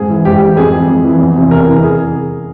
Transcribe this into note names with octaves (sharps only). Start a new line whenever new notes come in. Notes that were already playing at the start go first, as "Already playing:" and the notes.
Already playing: G#2 G#4
E3
G#2 G4
E3
F2 G#4
E3
F2
E3
E2
C3 E3
E2 A#4
C3 E3
G#4